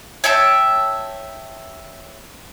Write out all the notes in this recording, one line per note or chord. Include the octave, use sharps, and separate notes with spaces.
C#5 E5 G5 A5